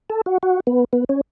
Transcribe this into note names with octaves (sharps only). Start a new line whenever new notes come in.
A4
F#4
F#4
B3
B3
C#4